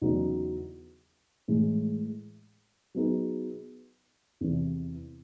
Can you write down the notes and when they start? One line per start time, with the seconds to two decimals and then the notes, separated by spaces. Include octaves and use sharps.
0.01 E2 C#3 F#3 B3 D#4
1.48 A2 E3 G#3
2.95 F#3 B3 D#4 G#4
4.41 E2 C3 E3